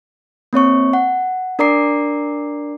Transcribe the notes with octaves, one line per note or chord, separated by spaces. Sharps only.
A#3 C4 C#5 C#6
F#5
D4 A#4 D5 A#5 D6 C7